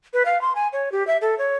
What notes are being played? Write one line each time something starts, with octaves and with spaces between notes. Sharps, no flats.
B4
F5
C6
G#5
C#5
G4
E5
A4
C#5